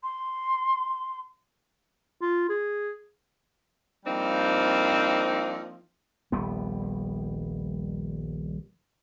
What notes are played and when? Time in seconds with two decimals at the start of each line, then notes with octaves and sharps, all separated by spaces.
0.03 C6
2.22 F4
2.49 G#4
4.06 F3 G3 A#3 C4 D4 D#4
6.32 D#1 A#1 G3 B3